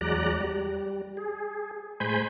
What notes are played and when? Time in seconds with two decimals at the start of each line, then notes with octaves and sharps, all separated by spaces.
0.01 E2 F#3 G#3 D5 A#5 F#6
0.41 G3
1.17 G#4
2.00 A2 G#3 C5 G#5 B5 G6